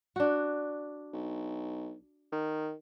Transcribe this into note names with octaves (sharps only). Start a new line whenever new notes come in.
D4 F#4
B1
D#3